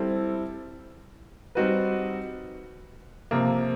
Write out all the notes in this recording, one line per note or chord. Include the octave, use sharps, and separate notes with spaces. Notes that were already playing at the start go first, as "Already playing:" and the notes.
Already playing: G3 C4 E4 A4
G3 C4 D#4 F#4 B4
C3 F3 A#3